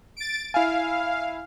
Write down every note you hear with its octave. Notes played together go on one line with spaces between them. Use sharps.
A6 D7
E4 F5 G#5